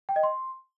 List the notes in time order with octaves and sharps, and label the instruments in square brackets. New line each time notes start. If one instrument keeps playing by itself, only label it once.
[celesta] G5
D#5
C6